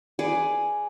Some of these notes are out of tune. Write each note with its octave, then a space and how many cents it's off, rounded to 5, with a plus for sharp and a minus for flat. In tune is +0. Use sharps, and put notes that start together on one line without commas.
G#4 +0 B4 +20 D5 +5